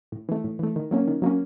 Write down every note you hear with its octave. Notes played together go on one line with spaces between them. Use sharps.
A2
E3 A3
A2
E3 A3
D#3
F#3 A#3 C#4
D#3
F#3 A#3 C#4